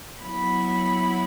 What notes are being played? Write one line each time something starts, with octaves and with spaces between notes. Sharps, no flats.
F#3 B3 E4 B5